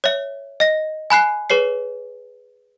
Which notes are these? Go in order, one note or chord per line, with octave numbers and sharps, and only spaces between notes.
C#5 E5
D#5 A#6
G#5 B5 F#6 C7
G#4 B4 C#5 C7